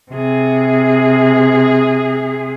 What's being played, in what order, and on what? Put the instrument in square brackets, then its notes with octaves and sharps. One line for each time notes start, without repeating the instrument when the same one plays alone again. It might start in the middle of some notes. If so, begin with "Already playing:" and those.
[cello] C3 G#4